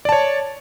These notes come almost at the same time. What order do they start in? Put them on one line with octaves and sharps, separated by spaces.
D5 A5 C#5